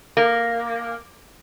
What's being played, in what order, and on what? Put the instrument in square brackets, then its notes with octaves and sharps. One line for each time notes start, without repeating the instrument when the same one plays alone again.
[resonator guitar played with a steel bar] A#3